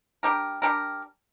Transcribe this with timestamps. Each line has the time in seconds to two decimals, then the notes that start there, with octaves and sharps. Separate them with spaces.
0.23 G3 D4 G4 A#4
0.62 G3 D4 G4 A#4